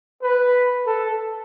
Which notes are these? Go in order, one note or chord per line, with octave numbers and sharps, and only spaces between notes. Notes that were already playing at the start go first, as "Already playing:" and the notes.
B4
A4